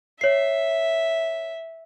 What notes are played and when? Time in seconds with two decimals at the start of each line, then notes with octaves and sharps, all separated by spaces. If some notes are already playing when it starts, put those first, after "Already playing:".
0.21 C#5 E5 C7